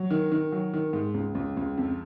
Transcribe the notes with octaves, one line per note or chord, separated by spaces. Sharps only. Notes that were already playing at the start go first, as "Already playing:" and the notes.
Already playing: F#3
D#3
D#3
F#3
D#3
G#2
C#2
C#2
C#2
F2